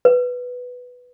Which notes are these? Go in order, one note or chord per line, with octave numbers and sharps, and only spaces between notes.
B4